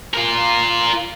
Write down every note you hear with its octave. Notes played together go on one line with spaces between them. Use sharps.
F4 A#4